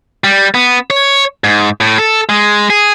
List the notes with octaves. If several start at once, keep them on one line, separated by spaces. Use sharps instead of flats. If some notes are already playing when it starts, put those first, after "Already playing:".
G3
B3
C#5
G#2
A2
A4
G#3
G#4